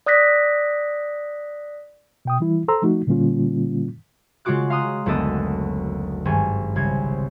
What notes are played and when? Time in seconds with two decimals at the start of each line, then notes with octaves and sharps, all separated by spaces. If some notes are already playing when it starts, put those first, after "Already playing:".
0.06 D5 D#6 F#6 A#6 B6
2.25 B2 G5 D#6
2.40 E3 G3 E4
2.68 A4 C5 A#5 C6 E6
2.82 F3 A3 D#4 F#4
3.07 A#2 D3 G3 A#3 C#4 F4
4.45 C#3 G#3 F4 F#4 D6 F#6
4.70 F5 A#5 C6 D#6 F#6
5.06 F#1 D2 B3 D4 A4 D#5
6.25 G#1 G2 G#5 C#6
6.76 C2 C#3 G#6